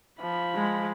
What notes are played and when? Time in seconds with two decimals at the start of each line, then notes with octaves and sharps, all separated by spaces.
0.21 F3 B5
0.55 G#3